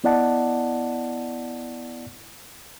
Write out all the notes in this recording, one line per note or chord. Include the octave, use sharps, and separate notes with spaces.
B3 E4 D5 D#5 F#5 A5